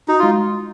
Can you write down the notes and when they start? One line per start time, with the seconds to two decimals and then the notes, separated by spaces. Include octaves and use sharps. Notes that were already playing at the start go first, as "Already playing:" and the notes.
0.08 D#4 F#4
0.19 G#3 F4